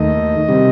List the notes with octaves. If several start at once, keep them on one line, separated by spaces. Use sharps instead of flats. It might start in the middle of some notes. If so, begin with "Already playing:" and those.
Already playing: D#2 D#3 A3 D#5
C3 D#3 G3